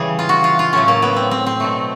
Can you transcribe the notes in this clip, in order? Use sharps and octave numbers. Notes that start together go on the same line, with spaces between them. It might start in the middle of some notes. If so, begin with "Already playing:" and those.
Already playing: C#3 E3 G3 G#4
F4
F#4
F4
F4
A2 F#3 A3 C#4
A#3
B3
C4
C4
C4
B2 F#3 A3